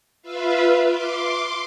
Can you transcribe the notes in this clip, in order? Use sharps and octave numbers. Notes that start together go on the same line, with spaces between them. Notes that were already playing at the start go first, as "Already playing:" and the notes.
F4 B4 E5 F5
C6 D6